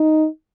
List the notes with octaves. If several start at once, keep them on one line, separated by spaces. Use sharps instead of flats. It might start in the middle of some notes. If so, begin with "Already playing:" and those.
Already playing: D#4